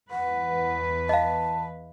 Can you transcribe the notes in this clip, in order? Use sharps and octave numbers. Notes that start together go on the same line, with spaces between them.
E2 B4 F#5
D#5 F5 A5